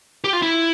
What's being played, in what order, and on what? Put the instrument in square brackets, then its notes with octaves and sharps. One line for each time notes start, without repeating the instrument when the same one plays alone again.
[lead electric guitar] G4
F4
E4